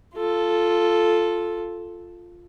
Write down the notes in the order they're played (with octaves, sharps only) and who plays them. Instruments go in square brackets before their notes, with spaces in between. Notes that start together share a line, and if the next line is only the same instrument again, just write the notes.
[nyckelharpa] F4 A4